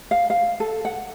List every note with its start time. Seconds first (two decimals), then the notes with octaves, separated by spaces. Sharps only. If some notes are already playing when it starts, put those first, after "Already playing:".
0.11 F5
0.30 F5
0.60 A4
0.85 F#5